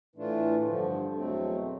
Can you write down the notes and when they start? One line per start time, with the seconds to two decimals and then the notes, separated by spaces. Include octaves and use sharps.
0.15 A2 E3 A3 D4 F4
0.66 G2 D3 F3
1.16 E2 B2 F#3 A3 C4